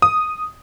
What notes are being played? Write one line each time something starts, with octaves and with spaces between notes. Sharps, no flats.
D#6